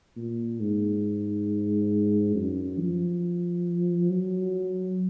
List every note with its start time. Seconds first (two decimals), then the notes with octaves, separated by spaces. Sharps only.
0.17 A#2
0.60 G#2
2.35 F#2
2.80 F3
4.10 F#3